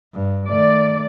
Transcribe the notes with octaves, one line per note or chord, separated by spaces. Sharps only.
G2
D#3 A3 D5